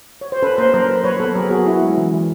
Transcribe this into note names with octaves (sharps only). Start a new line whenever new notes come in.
C#5
C5
C#4 A4 B4
A#3 A#4 C5
F#3 A#4 C5
F#3
F#3 B4 C#5
B3 A4 B4
F#3 G#4 A#4
B3 F#4 G#4
C#4 E4 F#4
G#3
E3
E3